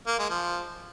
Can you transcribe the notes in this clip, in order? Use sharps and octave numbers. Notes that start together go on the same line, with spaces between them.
A#3
G#3
F3